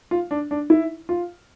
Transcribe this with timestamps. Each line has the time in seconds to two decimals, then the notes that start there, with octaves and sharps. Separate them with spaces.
0.11 F4
0.31 D4
0.51 D4
0.70 E4
1.09 F4